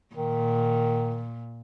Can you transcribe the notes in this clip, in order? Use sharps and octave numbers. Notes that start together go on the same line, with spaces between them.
A#2 D#3